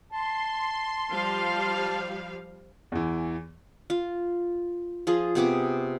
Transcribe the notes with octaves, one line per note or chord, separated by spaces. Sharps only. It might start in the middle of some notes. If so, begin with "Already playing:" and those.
A5 C6
F3 G3 F5
E2 E3
F4
F3 F4 G#4
C3 B3 G#4 D6